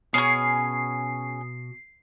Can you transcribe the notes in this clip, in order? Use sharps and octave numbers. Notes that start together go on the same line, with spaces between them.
B2 C#4 G#4 D#6 C7